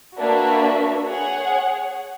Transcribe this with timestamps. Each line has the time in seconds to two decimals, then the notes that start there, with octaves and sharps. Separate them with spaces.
0.19 A#3 D4 F#4 B4 E5
1.06 G#4 C#5 F#5